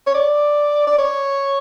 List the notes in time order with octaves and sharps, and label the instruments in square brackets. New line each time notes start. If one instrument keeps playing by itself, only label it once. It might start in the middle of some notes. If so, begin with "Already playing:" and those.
[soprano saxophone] C#5
D5
D5
C#5